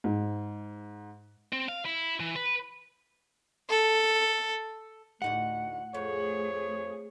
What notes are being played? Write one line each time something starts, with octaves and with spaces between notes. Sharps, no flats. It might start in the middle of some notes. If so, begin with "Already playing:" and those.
G#2
C4
F5
E4
E3
B4
A4
D2 A2 D#4 G4 F#5
F2 A3 G#4 C#5